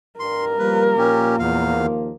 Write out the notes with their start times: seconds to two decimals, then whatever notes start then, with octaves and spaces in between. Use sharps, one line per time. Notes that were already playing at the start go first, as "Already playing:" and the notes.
0.20 G2 A#4 C6
0.59 F3 G3 A#3 B4
0.97 A#2 C#4 G4
1.39 E2 F5
1.77 D#2